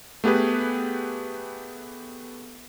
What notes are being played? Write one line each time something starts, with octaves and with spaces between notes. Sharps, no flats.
A3 B3 G4 G#4 B4